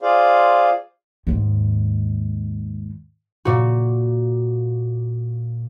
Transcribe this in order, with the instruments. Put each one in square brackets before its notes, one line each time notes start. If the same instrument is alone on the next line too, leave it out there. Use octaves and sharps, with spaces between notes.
[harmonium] F4 G#4 C5 D5 F5
[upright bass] D#2 G#2
[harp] A#2 F#4